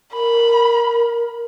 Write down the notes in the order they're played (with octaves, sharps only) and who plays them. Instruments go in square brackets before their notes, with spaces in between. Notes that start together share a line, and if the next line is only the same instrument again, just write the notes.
[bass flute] A#4 [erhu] B5